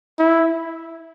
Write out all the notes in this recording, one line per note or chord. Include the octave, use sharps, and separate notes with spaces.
E4